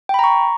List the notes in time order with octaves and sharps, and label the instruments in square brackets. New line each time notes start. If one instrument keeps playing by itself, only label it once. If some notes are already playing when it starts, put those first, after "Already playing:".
[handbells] G5
B5
A#5
C#6